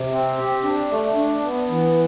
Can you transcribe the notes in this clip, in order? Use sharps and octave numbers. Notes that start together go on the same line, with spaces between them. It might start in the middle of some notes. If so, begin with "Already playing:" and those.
Already playing: C3
C4
G4
D4
A3
D4
B3
E3